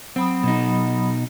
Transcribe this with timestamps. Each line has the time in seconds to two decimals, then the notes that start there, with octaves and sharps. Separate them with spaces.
0.16 F#3 C4 B5 D#6
0.43 B2 D#4